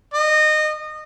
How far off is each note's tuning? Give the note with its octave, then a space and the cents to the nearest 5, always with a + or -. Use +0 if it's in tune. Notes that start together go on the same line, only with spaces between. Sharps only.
D#5 -25